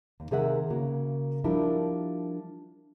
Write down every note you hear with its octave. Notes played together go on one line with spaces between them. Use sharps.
D#2
C3 D#3 G#4 A#4 E5 F#5
C#3 A#3 F#4
F3 G3 D4 E4 A#4